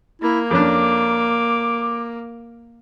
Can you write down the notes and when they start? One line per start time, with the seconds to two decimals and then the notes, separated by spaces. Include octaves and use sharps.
0.22 A#3 E4
0.51 F2 C#4 D4 D6